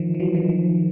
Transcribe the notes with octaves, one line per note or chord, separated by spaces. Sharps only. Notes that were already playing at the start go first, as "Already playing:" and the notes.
Already playing: D#3 F3
F3
E3 F#3
D#3 F3
D#3 F3